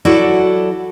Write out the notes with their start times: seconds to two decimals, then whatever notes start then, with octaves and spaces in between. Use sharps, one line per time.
0.05 F#3 E4 F#4 A4 D5